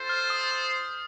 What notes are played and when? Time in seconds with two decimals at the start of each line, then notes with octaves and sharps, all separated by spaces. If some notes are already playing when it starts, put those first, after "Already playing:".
Already playing: F4 A4 C5
0.09 F6
0.30 D#6
0.51 D#6